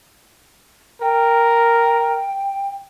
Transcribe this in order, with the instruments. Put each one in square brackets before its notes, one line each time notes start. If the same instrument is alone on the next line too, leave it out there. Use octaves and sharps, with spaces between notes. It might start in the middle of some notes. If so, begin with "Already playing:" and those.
[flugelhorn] A#4 [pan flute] G5